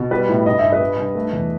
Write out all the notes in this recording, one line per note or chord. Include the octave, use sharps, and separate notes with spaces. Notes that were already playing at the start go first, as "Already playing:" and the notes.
Already playing: B2
G3 B4
A2
G2 D#5
G2 E5
B4 D#5
G3
G2
A3
E2